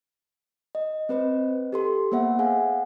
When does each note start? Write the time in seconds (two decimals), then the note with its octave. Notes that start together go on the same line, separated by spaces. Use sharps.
0.75 D#5
1.09 C4 B4 C5 D#5
1.73 G4 A4 C6
2.12 A#3 B3 C5 E5 F#5
2.39 G#4 F5 F#5 G#5